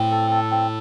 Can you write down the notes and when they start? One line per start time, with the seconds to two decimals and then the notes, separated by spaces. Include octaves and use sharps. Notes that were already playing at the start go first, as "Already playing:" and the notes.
Already playing: A2 C4
0.11 A4
0.31 A4
0.51 C4